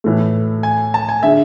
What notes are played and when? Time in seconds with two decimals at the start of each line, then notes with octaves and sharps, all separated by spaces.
0.04 A2 E3 A3
0.63 G#5
0.94 A5
1.09 G#5
1.23 D3 G#3 D4 E5